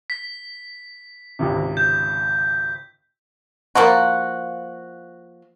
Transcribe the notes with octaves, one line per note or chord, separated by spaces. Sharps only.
B6
G#1 C#2 C3
G6
F3 A#3 F4 F#4